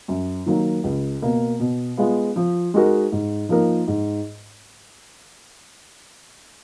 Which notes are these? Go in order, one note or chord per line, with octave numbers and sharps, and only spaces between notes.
F#2
D#3 F#3 A#3
C#2
B2 A#3
B2
G#3 B3 F4
F3
G#3 D#4 F#4 A#4
G#2
F3 A#3 D#4 A#4
G#2